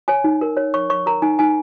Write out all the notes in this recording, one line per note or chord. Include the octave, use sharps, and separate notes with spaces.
C#5 G#5
D#4
A#4
C#5
C#5 C#6
C#5 C#6
A#4 A#5
D#4 G#5
D#4 G#5